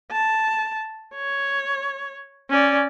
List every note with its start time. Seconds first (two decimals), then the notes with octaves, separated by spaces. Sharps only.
0.11 A5
1.15 C#5
2.50 C#4 D5